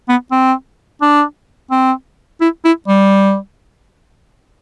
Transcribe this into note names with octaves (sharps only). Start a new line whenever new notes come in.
B3
C4
D4
C4
E4
E4
G3